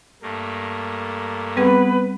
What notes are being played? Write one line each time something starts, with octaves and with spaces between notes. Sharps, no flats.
G2 A3 A#3
G3 B3 C4 G#4 B4